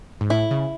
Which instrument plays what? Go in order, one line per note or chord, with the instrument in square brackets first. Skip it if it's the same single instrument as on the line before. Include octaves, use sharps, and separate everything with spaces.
[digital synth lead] G#2
[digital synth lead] A2 [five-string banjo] E4
[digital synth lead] C#3